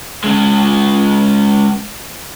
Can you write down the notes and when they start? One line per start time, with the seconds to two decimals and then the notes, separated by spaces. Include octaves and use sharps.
0.24 C#3 G#3